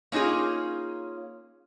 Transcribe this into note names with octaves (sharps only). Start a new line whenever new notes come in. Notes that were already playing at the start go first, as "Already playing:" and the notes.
A#3 C#4 D#4 F4 G#4